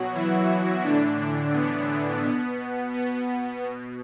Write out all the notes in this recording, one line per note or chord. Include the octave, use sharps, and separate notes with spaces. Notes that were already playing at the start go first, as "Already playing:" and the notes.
Already playing: B2 F#3 F#4
E3 E4
A2 D3 E3 D4
B3
B2 B3
B3
B2